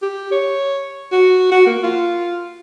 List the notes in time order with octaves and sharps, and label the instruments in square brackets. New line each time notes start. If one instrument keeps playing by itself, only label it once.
[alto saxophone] G4
C#5
F#4
F#4
A#3
F4